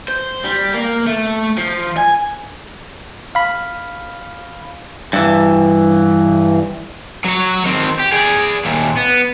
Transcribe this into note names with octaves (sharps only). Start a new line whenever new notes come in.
C5
G3
A#3
A3
F3
G#5
F5 B5
G2 E3
F#3 C#5
D#3 C4
G4
G#4 D5
D#2 A#2
B3